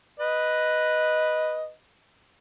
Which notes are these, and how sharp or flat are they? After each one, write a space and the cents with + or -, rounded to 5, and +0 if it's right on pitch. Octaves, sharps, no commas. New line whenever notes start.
B4 -5 D#5 +0